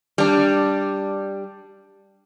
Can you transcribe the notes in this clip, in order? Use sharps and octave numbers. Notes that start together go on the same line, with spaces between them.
G3 D4